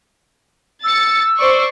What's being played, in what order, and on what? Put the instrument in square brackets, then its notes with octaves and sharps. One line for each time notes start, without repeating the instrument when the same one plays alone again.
[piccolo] E6 [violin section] A6 C#7
[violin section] C5 D5 C#6